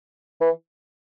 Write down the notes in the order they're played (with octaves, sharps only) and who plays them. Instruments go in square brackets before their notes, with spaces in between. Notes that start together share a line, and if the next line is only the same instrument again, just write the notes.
[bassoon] E3